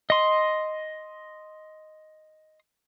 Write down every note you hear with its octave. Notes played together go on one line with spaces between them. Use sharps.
D#5 C6